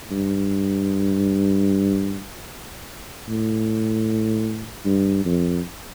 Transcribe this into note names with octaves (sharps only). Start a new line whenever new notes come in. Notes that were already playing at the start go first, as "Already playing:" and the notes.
G2
A2
G2
F2